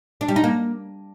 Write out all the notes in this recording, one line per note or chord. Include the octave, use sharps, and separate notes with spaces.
D4
G3
D#4
A#3